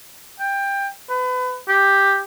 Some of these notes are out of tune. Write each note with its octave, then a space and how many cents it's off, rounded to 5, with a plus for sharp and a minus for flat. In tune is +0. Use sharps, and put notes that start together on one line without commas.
G5 +20
B4 +30
G4 +5